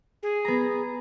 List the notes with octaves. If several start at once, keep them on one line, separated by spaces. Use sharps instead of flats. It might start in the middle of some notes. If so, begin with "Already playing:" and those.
G#4
B3 A#5